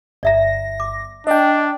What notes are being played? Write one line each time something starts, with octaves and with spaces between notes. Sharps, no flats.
G1 D5 E5 A#5 A#6
D6
D4 D#5 G5